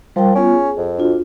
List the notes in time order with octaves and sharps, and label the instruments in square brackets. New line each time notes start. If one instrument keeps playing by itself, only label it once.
[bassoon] F3 [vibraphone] G3 A#4 G5
[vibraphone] B3 F4 [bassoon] C#4
[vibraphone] G#4
[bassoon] F2
[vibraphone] D4 F4 F#4